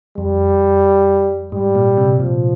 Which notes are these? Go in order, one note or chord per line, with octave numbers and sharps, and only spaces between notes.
F2 G3
G#2 G3
A#2
C3
A#2 F3